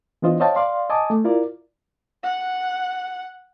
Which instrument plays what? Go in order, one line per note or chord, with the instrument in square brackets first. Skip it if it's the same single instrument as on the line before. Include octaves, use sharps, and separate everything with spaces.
[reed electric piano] E3 B3 D4 F4 C5 D#5
C5 C#5 D#5 F5 G5 A5
D5 F5 C6
D#5 G#5 A5 D6 D#6
A3
E4 F4 A#4 D5
[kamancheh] F#5